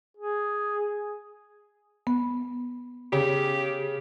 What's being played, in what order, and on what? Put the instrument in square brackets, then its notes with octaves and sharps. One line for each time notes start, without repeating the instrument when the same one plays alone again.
[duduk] G#4
[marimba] B3
[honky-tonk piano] C#3 [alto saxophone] G4